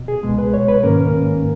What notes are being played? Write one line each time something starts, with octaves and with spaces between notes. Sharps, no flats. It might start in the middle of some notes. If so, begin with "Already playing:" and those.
Already playing: B2
G#4
C#2 B2 G#3
B4
C#5
B4
G#2 D#3 A#3 C#4 A#4